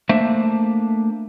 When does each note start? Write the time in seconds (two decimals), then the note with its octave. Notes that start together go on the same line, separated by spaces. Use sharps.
0.09 A3 A#3 D4 C5 E5